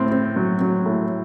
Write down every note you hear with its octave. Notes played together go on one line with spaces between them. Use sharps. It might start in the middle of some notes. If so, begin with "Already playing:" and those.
Already playing: A2 C4
C4
F#3
F#3
A2